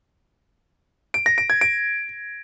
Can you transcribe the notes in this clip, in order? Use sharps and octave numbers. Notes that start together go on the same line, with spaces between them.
D7
A#6
D7
G#6
D7